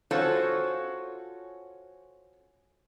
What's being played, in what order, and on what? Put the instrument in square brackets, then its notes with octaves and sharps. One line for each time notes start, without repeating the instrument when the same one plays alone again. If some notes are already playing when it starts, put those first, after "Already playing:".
[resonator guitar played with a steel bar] C#4 F4 F#4 A4 C5 C#5